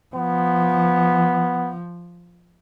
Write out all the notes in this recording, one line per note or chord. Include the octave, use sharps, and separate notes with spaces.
F3 B3